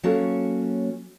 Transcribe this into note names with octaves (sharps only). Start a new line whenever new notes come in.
F#3 A#3 C#4 F#4 A4 C#5